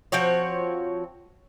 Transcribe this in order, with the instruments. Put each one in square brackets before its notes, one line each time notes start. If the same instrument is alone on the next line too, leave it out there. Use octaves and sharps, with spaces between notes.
[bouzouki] F3 C4 F#4 C#5